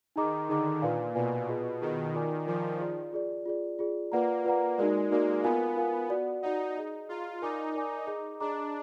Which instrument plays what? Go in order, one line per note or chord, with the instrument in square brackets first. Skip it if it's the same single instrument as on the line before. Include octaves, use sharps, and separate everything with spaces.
[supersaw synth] D#3 [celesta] D#4 G#4 D#5 A#5 D6
[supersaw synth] D3 [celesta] D#4 G#4 D#5 A#5 D6
[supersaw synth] A#2 [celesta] F4 B4 D5 F5 G#5
[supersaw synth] B2 [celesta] F4 B4 D5 F5 G#5
[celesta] F4 G#4 B4 D#5
[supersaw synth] D#3 [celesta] F4 G#4 B4 D#5
[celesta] F4 A#4 D5 G#5 D6
[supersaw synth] F3 [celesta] F4 A#4 D5 G#5 D6
[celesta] F4 G#4 D5
F4 G#4 D5
F4 G#4 D5
F4 G#4 D5
[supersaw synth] A#3 [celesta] F4 B4 D5 F#5 A#5
[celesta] F4 B4 D5 F#5 A#5
[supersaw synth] G#3 [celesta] D#4 F#4 A#4 D5
[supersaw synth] A#3 [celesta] D#4 F#4 A#4 D5
[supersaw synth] B3 [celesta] F4 A#4 F5 G#5
[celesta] F4 A#4 F5 G#5
F#4 D5 F#5
[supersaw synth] D#4 [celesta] F#4 D5 F#5
[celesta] G#4 D#5 A#5
[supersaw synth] F4 [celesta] G#4 D#5 A#5
[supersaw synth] D#4 [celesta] A#4 D5 G#5 D6
[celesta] A#4 D5 G#5 D6
G#4 D#5 A#5 D6
[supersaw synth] D4 [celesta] G#4 D#5 A#5 D6